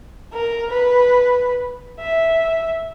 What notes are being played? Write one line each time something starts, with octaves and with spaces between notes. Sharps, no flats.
A#4
B4
E5